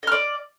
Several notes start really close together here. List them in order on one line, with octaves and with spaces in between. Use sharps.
D#5 F6 D5